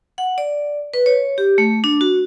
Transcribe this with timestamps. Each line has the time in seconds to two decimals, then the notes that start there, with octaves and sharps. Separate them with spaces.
0.18 F#5
0.38 D5
0.94 B4
1.06 C#5
1.38 G4
1.58 A3
1.84 D4
2.01 F#4